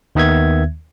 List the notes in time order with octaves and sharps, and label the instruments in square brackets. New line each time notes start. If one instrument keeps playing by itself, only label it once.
[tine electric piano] D#2 D#3 B3 E5 G#6